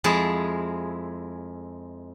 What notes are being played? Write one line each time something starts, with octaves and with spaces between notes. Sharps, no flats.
F2 G#3 E4 G#4 A5